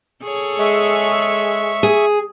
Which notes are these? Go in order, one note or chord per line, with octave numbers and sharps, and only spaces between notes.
G#4 A4 C#5
G#3 E5 C#6
G#4